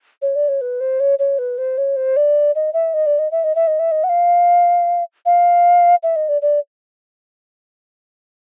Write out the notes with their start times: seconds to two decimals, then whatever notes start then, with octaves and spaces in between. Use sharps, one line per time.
0.22 C#5
0.35 D5
0.48 C#5
0.61 B4
0.81 C5
1.00 C#5
1.19 C#5
1.39 B4
1.58 C5
1.78 C#5
1.96 C5
2.17 D5
2.55 D#5
2.73 E5
2.94 D#5
3.06 D5
3.19 D#5
3.31 E5
3.44 D#5
3.55 E5
3.67 D#5
3.79 E5
3.91 D#5
4.04 F#5
4.09 F5
5.26 F5
6.03 E5
6.16 D#5
6.29 D5
6.42 D5